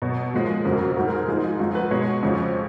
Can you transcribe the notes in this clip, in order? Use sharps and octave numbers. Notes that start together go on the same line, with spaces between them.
B2 F#3 C#5
A#2 F3 G#3
F2 C#3 F#3 A#4
F#4
G#2 F#3 A#4
A#4
G#4
G#2 F3 G#3 G#4
D#4
F4
F#2 F3 G#3 F#4
B4
B2 G#3 C#5
F2 C#3 F3 G#3